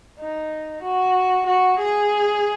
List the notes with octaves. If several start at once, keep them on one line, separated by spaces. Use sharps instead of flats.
D#4
F#4
F#4
G#4